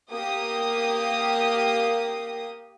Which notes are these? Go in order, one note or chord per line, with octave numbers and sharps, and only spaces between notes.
A#3 G4 D#6